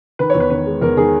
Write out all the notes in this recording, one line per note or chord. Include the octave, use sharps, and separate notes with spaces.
D#3 B4
E2 C#5
B4
D#3 B4
G#3
E2 A#4
D#3 G#4